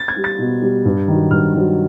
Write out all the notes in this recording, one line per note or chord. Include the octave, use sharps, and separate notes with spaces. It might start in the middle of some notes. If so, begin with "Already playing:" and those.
Already playing: A6
G#6
G3
A6
B2
G3
G2
D#3 F#3
G2 F6
D#3 F#3